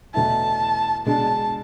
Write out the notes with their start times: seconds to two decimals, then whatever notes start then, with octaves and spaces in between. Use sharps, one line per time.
0.14 E2 B2 A3 E4 A5
1.06 B2 G#3 D4 A5